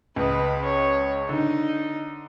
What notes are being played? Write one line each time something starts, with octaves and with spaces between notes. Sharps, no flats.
C#2 B4 D#5
C#5
D3 D#4